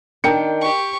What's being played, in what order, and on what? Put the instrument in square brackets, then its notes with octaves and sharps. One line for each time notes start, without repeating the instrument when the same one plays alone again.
[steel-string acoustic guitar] D#3 D4 [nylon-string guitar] A#4 [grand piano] G5 C#7
[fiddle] G4 C#6